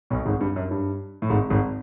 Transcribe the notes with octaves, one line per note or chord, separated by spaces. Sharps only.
B1 B2
G#1 G#2
G2
F#2
G2
A2
G#1 G#2
G#1 G#2